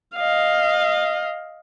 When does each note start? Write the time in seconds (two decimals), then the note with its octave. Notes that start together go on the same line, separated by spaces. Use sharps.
0.16 D#5 F5